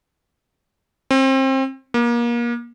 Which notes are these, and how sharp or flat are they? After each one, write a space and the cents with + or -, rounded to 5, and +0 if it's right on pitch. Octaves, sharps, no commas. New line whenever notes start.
C4 +30
A#3 +30